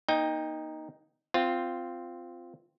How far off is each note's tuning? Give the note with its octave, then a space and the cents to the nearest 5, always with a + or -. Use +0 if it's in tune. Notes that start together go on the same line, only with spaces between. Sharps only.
A#3 +35 D#4 +0 G5 +25
C4 -10 F4 +0